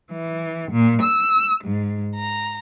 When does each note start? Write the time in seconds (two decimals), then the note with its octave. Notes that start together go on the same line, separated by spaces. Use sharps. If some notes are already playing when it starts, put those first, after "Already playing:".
0.11 E3
0.72 A#2
1.02 E6
1.64 G#2
2.16 A#5